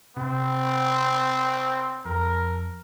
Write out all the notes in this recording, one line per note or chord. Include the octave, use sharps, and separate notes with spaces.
C3 C4
F2 A#4